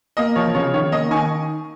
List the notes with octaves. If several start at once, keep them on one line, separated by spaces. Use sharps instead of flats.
A#3 D#5
F3 C#5
C#3 C#5
D#3 C#5
A#3 D#5
D#3 G#5 C#6